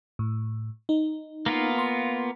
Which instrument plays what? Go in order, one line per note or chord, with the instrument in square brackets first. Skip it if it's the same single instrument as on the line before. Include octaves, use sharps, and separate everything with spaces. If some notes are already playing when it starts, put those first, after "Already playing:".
[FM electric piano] A2
D#4
[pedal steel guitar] A#3 B3 F4
[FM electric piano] C6